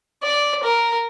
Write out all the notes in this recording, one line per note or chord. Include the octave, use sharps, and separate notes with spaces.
D5
A#4